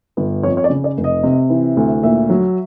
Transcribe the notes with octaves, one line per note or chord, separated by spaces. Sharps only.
G1 B4
F2 C#5
C#5
D5
C#3
D5
F1
D#5
C3
E3
D2
A#2 E5
F#3